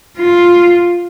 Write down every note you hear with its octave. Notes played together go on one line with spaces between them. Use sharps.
F4